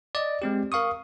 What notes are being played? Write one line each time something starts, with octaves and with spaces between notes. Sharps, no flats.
D5 D#5
G#3 C4 G4
A#4 F5 C#6 D#6